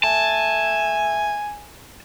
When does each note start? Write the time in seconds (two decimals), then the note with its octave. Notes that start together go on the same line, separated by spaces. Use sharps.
0.04 A3 G#5 A5